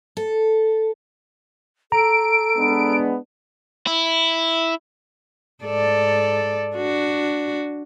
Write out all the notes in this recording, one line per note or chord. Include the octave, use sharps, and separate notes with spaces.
A4
A4 A#5 D7
G#3 B3 D4
E4
G#2 A4 D5
D4 F#4